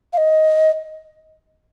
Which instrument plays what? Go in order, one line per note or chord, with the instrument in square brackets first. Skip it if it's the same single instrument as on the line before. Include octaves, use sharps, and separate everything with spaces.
[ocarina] F5
D#5